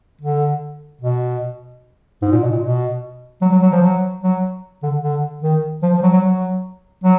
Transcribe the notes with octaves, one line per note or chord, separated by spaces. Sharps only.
D3
B2
G#2
A#2
B2
A#2
B2
F#3
F#3
F#3
F3
F#3
F#3
D3
D3
D#3
F3
F3
F#3
F#3
F#3
F#3